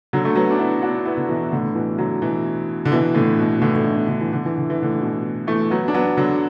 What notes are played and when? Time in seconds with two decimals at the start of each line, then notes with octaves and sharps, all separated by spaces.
0.13 D3 F#3
0.25 A3
0.36 F#3 B3
0.51 D4
0.59 B3 E4
0.82 D4 F#4
1.05 B3 E4
1.17 D3
1.29 B2 E3
1.51 A2 D3
1.75 B2 E3
1.98 D3 F#3
2.22 B2 E3
2.85 D3
2.92 B2 E3
3.15 A2 D3
3.38 B2
3.57 B2
3.62 A2 D3
3.76 D3
3.85 B2
4.08 D3
4.21 E3
4.33 D3
4.45 E3
4.58 D3
4.70 E3
4.82 A2 D3
5.01 B2 E3
5.47 E3 A3
5.70 F#3 B3
5.88 D4
5.94 F#3 B3
6.17 D3 F#3